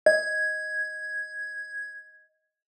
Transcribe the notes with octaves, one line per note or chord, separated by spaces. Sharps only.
D#5 G#6